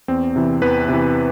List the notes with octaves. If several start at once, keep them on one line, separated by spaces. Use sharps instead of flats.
E2 C4
C3 E3
E2 B4
C3 E3